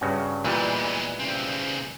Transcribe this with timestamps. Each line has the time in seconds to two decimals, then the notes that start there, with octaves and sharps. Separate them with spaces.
0.01 G2 C#3 F#4
0.45 A#2 E3 G3 G#3 B3
1.19 C#3 C4